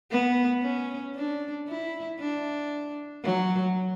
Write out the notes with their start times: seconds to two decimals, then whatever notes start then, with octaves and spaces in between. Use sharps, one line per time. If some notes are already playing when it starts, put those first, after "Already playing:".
0.10 B3
0.62 C#4
1.15 D4
1.67 E4
2.19 D4
3.23 F#3